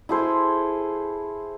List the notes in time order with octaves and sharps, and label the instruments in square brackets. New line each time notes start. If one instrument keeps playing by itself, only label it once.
[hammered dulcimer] E4 G#4 A4 C5